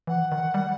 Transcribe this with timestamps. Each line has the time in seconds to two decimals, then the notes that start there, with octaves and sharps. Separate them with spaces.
0.07 E3 F#5
0.32 D#3
0.54 G3